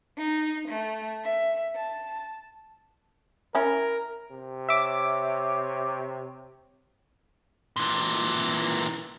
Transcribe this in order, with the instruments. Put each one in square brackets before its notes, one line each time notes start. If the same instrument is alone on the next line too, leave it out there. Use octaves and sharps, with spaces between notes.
[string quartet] D#4
A3
E5
A5
[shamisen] C#4 E4 [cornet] A#4
[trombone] C3
[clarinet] C#5 [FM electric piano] E5 D6
[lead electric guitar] A#2 E3